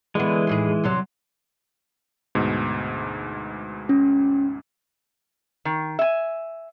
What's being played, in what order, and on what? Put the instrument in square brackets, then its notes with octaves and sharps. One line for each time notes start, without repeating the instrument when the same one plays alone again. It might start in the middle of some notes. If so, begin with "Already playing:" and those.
[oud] D3 B3 [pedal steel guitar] E3 G#3
[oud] D#2 A2 G#4
E2 C3 F#3
[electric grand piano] D2 G#2 B2
[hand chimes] C#4
[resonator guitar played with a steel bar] D#3
E5 G#5